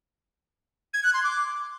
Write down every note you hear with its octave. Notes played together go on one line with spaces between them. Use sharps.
G#6
F#6
C6
D6